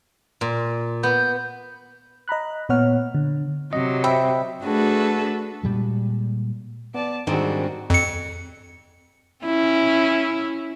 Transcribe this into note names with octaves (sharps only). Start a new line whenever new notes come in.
A#2
B3 G6
D#5 A#5 B5 F#6
A#2 B3 C#5 F#5 F6
D3
C3 F#3 D#5
C5 E5 G5 B5
A3 D4 F#4 G#4 A4 B4
A#2 G3 G#3
B3 D5 A5
G#2 D#3 G3 C4 D4 D#4 F#4 G#4
F2 C#7
C#4 E4